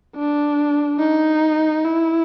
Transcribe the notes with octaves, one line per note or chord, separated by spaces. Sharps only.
D4
D#4
E4